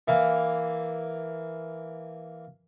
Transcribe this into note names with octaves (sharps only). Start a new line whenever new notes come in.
E3 A#3